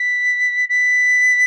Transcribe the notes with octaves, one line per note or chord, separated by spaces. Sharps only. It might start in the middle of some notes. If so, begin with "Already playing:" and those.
Already playing: B6
B6